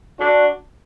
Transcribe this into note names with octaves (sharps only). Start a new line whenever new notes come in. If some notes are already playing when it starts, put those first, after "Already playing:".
D4 F#4